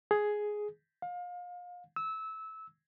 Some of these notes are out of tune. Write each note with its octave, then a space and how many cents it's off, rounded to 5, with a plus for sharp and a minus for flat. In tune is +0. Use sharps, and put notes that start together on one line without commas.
G#4 +5
F5 +30
E6 -20